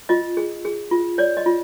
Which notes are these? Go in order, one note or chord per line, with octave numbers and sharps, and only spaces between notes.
F4 D#5
G#4
G#4
F4
C#5 D5
D#5
F4